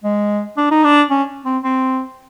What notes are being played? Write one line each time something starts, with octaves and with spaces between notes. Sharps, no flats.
G#3
D4
D#4
D4
C#4
C4
C4